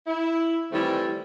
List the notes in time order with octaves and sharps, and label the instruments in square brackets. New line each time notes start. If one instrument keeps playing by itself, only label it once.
[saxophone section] E4
D#3 E3 G3 A3 C4 E4